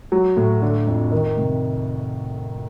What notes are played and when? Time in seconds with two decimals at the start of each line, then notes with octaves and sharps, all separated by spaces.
0.12 F#3
0.37 A2
0.62 D3
0.87 F2
1.11 D#3
1.37 C3